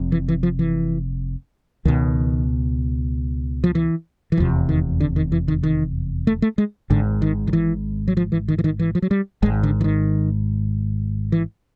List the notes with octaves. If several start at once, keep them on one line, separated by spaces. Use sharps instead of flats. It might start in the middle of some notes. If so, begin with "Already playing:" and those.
Already playing: F1 F2 C3
E3
E3
F3
E3
C#2 B2 D#3
F3
E3
E3
F1 E2 C3 F3
D#3
D3
D#3
E3
D#3
D#3
A3
A3
G#3
G#1 G#2 D3
D#3
D#3
E3
F#3
F3
E3
D#3
E3
D#3
E3
F3
F#3
G3
G#1 G#2 G#3
D3
E3
D#3
E3